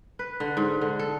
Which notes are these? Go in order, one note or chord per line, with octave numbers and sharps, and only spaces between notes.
B4
D3
G#2
D3
A4